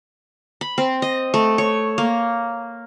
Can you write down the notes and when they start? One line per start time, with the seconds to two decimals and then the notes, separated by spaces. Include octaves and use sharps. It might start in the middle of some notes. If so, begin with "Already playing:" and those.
0.61 B5
0.78 C4
1.02 D#5
1.34 A3
1.58 C#5
1.98 A#3